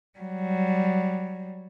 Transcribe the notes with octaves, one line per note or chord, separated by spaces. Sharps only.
F#3 G3